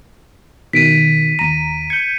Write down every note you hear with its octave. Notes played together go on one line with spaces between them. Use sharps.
B2 D#3 B6 D7 D#7
D#2 A#5 D#7
G6 G#6 C#7